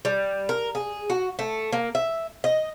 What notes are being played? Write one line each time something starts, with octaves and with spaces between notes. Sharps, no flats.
G3
A#4
G#4
F#4
A3
A#3
E5
D#5